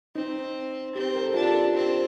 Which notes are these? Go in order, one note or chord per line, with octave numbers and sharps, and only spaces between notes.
C4 D#4
C4 G4
A#4
A4
D4 F4
G4
A4
C4